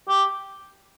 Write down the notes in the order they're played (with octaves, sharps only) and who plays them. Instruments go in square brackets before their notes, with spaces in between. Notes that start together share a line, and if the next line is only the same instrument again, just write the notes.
[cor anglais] G4